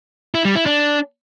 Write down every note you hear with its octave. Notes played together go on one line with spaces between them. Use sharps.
E4
G3
E4
D4